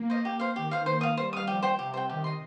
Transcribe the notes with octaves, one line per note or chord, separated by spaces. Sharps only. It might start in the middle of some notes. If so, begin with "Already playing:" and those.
Already playing: A#3
C5 D#5
G4
C5 F5
D#3 G4
C5 F5
A#3 C5
F5 D#6
G3 C5
F5 D#6
F3 G4
C5 G5
C3 G4
C5 G5
D#3 G4
D#5 C6